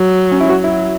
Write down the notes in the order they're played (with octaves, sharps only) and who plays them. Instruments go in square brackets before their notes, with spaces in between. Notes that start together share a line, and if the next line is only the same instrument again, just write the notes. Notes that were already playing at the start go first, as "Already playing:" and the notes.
Already playing: [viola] F#3
[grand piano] C#4
E4
[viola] F#3 [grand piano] F#4
[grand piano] E4